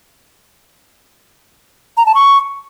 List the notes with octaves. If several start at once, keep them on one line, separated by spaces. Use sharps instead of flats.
A#5
A5
C#6